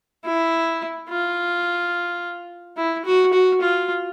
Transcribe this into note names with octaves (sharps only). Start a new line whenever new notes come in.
E4
F4
E4
F#4
F#4
F4